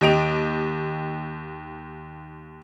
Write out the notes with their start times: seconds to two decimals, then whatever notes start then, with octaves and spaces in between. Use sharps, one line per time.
0.01 D#2 G4 D#5 D7 F7